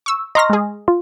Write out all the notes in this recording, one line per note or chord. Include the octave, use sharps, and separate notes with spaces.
C#6 E6
D#5 A#5 C6 C#6 F6 A#6
G#3 G#4
F4